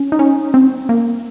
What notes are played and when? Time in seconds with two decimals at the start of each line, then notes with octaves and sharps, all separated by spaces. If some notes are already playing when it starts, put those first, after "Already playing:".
Already playing: C#4
0.12 D#4
0.19 C#4
0.54 C4
0.89 A#3